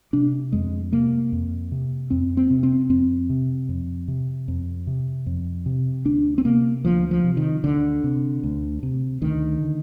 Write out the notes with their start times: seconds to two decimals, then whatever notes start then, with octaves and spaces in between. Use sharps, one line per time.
0.13 C3 D4
0.52 F2 G#3
0.93 C3 A#3
1.32 F2
1.72 C3
2.10 F2 C4
2.37 C4
2.50 C3
2.63 C4
2.89 F2 C4
3.30 C3
3.69 F2
4.08 C3
4.48 F2
4.87 C3
5.26 F2
5.66 C3
6.05 D2 D4
6.38 C4
6.45 C3 A#3
6.85 D2 F3
7.11 F3
7.24 C3
7.37 D#3
7.64 D2 D3
8.04 C3
8.43 D2
8.83 C3
9.22 D2 D#3
9.61 D3